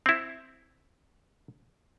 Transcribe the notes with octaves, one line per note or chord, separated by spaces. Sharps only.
C4 E4